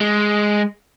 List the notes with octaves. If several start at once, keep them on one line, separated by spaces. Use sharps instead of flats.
G#3